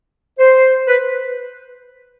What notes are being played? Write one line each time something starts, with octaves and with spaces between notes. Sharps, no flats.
C5
B4